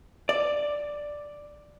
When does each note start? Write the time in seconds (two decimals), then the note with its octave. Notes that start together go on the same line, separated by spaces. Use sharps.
0.29 D5